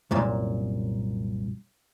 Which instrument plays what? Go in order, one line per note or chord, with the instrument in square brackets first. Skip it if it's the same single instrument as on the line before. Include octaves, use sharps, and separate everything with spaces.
[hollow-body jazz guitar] C2 F#2 A#2